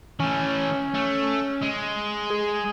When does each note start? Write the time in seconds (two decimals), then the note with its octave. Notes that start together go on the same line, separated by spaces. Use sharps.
0.20 E3 A3 C#4
0.94 A3
1.62 G#3
2.30 G#4